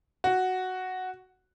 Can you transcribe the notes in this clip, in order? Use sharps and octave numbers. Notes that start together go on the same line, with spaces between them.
F#4